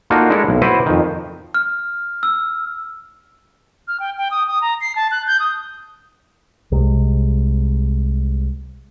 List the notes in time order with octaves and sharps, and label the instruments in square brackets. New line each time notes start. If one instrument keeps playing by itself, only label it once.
[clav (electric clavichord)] A#3 D4 D#4 F4 F#4 A4
G#3 D4 E4 A4 A#4
B1
E4 F#4 B4 C5 D5 E5
F2 D#3
[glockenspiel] F6
E6
[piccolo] F6
G5
G5
D#6
D#6
A#5
C7
A5
F#6
G6
D#6
[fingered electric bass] C2 C3 G#3